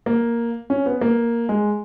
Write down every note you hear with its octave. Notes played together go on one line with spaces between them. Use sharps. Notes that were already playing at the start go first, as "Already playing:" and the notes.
A#3
C#4
B3
A#3
G#3